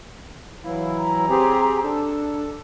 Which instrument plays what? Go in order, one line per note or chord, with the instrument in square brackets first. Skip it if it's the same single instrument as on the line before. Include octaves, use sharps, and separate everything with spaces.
[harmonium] E3 F#3 E4 [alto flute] F5
[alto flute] A#5
[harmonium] C4 G4 G#4
[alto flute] D4 [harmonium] A4